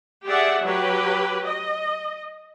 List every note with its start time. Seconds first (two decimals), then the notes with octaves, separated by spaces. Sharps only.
0.25 G4 G#4 D5 E5 F#5
0.63 F#3 G4 B4
1.45 D#5